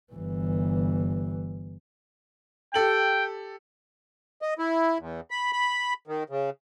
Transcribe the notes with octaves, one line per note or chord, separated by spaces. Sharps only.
G1 E3
G4 A4 G5 F#7
D#5
E4
E2
B5
B5
D#3
C#3